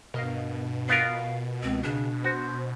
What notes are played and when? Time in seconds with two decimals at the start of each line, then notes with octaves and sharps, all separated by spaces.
0.14 G2 B2 A#4 D#5 F5
0.89 B3 F4 A#4 F5
1.63 C#2 C4
1.83 C#3 D4
2.24 F#4 C5